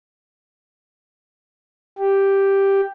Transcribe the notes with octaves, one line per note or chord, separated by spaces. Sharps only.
G4